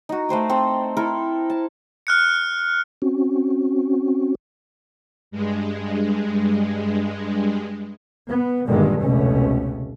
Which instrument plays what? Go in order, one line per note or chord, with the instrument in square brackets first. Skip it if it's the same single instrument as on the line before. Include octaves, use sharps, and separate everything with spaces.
[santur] D#4 F#4
A3 B4 C5 G5
C4 A4
E4 A4 A#4
A5
[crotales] F6 F#6 C#7
[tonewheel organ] C4 C#4 F#4
[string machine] G2 G#3
[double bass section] B3
G1 G2 A#2 D3 D#3 G#3
F1 C#2 B2 A3 C#4